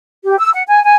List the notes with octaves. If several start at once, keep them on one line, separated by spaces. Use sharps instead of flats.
G4
E6
F#5
G#5
G#5